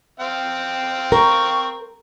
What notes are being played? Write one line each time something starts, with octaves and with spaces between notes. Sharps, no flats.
C4 F5 G5
A#4 C#6